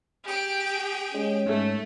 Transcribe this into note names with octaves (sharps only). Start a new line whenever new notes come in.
G4 G#4 G5
G#3 C#4
G#2 A3